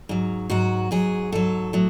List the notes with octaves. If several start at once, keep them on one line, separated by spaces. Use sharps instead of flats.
G#2 F#3
G#2 F#3 F#4
G#2 F#3 G#4
G#2 F#3 A4
A2 F#3